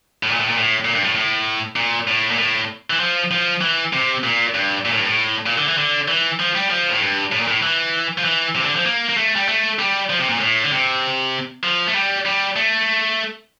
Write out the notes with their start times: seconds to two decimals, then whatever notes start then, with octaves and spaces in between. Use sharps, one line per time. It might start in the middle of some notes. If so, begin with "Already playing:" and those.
0.23 A2
0.31 A#2
0.40 A2
0.49 A#2
0.58 A2
0.85 A#2
0.94 G2
1.04 A2
1.15 A2
1.76 A#2
2.08 A2
2.31 A#2
2.38 A2
2.90 E3
3.00 F3
3.31 F3
3.61 E3
3.93 C3
4.24 A#2
4.54 G2
4.85 A#2
4.92 A2
4.99 G2
5.06 A2
5.46 A#2
5.58 D3
5.68 E3
5.78 D3
6.08 E3
6.40 F3
6.55 G3
6.70 F3
6.90 A2
7.01 G2
7.32 A2
7.40 A#2
7.47 A2
7.63 E3
8.18 F3
8.24 E3
8.55 C3
8.61 E3
8.65 D3
8.76 F3
8.85 A#3
9.09 A#3
9.17 A3
9.36 G3
9.48 A3
9.79 G3
10.10 F3
10.20 C3
10.29 A#2
10.40 A2
10.64 D3
10.71 C3
11.64 F3
11.88 A3
11.95 G3
12.26 G3
12.56 A3